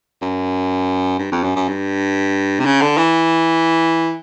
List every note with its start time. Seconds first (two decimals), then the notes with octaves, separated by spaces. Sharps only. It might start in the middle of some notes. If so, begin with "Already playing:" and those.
0.22 F#2
1.19 G2
1.32 F2
1.43 F#2
1.56 F#2
1.68 G2
2.60 C3
2.65 C#3
2.81 D3
2.97 E3